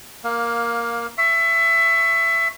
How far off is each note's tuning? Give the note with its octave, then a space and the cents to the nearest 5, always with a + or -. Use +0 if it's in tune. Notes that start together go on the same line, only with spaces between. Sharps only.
A#3 +5 F5 +20
E5 +20 C#6 +0